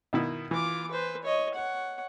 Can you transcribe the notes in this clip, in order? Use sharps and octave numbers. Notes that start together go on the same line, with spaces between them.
B2 D#3 E4
E3 F4 D6
B4 C5
C#5 D#5
C#5 F#5